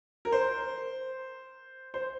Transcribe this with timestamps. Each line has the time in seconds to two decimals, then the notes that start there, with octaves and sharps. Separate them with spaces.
0.25 A#4
0.32 C5
1.94 C5